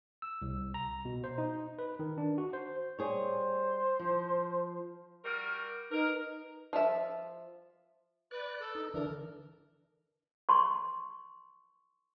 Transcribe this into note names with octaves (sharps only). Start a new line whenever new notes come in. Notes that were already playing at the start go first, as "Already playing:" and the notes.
E6
C2
A#5
B2
C5
D#4
B4
D#3
D4
F#4
C5
G3 G#4 C5 C#5
F3
G3 F#4 A#4
D#4 A#4 B4
F3 E5
B4 D5 F#6
A4
D#4
D3 E3 D4 A#4
C6 C#6